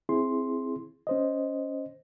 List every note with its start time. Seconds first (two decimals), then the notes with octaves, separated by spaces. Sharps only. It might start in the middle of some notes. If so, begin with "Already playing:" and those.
0.09 C4 E4 G#4 C6
1.07 C#4 C5 D#5